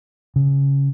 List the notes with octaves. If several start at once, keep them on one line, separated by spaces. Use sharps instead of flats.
C#3